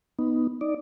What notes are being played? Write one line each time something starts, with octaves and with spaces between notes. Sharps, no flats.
B3 D#4
D#4 D5